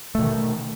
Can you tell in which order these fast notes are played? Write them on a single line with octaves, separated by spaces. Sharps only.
A3 B2 D#3